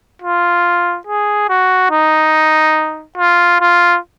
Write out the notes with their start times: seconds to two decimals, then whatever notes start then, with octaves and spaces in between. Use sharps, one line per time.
0.22 F4
1.07 G#4
1.49 F#4
1.91 D#4
3.17 F4
3.60 F4